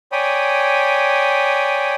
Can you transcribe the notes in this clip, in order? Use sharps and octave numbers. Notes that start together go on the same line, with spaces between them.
C#5 D5 G5 G#5 B5 D#6